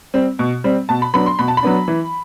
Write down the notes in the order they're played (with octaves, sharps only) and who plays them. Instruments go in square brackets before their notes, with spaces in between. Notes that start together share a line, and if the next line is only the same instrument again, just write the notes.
[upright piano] G3 C4
B2
G3 C4
B2 A5
B5
F#3 B3 D4 B5
C6
B2 B5
A5
B5
F#3 B3 D4
E3